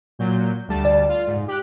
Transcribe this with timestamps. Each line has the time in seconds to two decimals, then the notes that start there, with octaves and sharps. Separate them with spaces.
0.19 A#2 F#3 G6
0.68 D2 G3 A5
0.85 D5
1.09 F4
1.27 G#2
1.48 G4 F#6